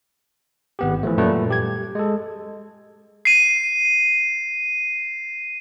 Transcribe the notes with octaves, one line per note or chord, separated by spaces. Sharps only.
G#1 B3 G4
E3 F3 A3
F#2 A#2 G3 A3 B4
G4 G#6
G#3 A4
C7 D#7